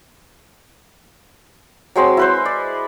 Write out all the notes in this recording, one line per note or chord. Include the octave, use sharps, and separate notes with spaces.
F#3 G#3 C4 C6
E4 B4 C5
D5